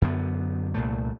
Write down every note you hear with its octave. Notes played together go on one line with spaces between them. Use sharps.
F#2 D3 B3
C2 A#2 A3